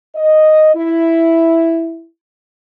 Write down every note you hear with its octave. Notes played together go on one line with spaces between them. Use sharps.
D#5
E4